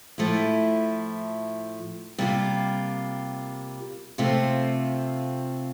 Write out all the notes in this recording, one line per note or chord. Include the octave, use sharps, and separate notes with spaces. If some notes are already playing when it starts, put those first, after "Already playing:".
A2 F3 A3 E4
C3 G3 A#3 F4
C3 F3 A3 C4 F4